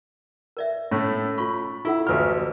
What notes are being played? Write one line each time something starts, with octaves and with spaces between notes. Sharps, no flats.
A#4 D5 E5
A2 A3 C#4
F4 B5 C#6
E4 F4 A4 F#5
A1 D2 F4 B4 G#5 F6